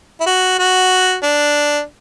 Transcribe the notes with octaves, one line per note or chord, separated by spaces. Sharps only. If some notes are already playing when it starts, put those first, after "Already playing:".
E4
F#4
F#4
D4